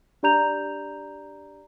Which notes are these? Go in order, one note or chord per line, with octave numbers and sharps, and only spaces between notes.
D4 G4 D5 A#5 G6 F7